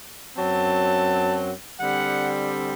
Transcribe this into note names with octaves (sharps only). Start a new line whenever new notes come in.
F#2 F#3 C4 A5
D3 G3 C4 F#5